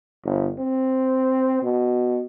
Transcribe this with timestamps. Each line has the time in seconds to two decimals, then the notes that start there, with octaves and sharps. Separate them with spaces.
0.25 G1
0.59 C4
1.63 B2